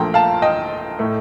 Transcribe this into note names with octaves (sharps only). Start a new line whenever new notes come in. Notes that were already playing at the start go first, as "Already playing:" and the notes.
Already playing: A#1 A#2 F3 A3 G5 A#5
F5 A5
D#5 G5
A2 A3